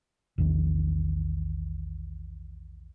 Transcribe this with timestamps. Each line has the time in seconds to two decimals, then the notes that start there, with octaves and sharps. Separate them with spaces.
0.38 A#1 E2 D#3